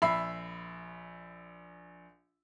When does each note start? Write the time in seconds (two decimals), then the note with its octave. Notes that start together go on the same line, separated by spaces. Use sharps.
0.02 A#1 E5 B5 E6 C7